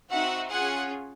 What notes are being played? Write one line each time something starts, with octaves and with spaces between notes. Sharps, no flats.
C4 D#4 F#4 E5 F#5
C#4 F4 G#4 F#5 G#5